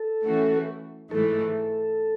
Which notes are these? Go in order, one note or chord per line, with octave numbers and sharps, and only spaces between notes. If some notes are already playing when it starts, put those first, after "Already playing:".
Already playing: A4
E3 A3 C#4 F#4
G#2 E3 A3 A4